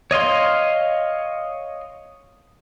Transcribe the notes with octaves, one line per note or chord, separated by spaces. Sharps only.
C#5 D#5 F5 C6